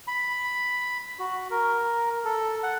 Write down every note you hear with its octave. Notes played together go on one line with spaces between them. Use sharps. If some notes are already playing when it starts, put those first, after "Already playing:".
B5
F#4
A#4
A4
F#5